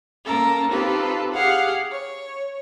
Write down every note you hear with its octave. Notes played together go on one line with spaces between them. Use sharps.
A#3 C#4 A4 A#4
C4 D#4 F4 G4 A4 B4
G4 G#4 F5 F#5
C#5